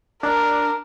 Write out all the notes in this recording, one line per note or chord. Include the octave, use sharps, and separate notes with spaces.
D4 A#4